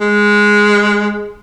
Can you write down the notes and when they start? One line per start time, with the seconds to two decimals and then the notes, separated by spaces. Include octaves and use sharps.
0.01 G#3